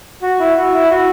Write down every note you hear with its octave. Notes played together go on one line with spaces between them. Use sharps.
F#4
E4
F#4
E4
F#4